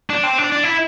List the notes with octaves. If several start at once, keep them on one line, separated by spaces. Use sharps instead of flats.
D4
C4
D4
D4
E4